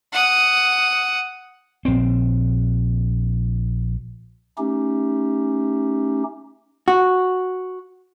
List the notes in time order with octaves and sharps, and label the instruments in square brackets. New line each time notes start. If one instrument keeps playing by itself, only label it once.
[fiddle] F#5 D#6
[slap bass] A#1 C4
[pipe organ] A3 C#4 D#4 G4
[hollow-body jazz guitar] F#4